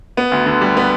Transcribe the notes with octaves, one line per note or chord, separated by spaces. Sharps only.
B3
D2
D3
G3
B3